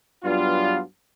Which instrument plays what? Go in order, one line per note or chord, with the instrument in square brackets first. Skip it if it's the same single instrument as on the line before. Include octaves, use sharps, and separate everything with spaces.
[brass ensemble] G2 F#3 B3 D4 F4